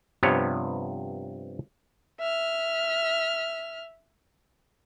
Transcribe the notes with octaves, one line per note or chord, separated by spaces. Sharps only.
G2 C3 F3 B3 C#5
E5 F6